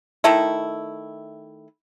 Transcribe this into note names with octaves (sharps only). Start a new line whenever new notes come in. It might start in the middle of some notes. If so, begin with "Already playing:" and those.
D#3 A3 E4